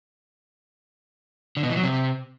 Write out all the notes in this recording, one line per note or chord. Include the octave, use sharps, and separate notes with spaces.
D3
B2
E3
F#3
C3